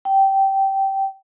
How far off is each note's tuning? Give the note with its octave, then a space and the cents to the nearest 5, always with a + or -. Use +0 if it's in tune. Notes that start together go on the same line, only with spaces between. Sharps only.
G5 -15